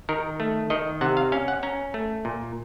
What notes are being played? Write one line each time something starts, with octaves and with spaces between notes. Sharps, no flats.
D#3 A#4
A3
D#3 D#5
C3 F#5
F5
C#4 F5
F#5
C#4 A#5
A3
A#2